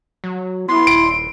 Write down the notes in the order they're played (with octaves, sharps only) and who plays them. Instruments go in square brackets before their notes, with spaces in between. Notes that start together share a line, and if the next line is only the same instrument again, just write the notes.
[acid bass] F#3
[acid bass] B3 [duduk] E4 [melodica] C6
[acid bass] D#1 [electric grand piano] D7